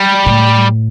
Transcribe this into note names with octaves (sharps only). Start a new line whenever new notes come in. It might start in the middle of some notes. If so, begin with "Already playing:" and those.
Already playing: G3
A2